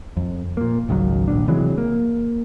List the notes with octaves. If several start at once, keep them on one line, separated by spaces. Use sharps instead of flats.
F2
A#2 A#3
G#1 C#2 D#3 F#3
D#1 A#1 D4
C3 E3 F#3 G#3
A#3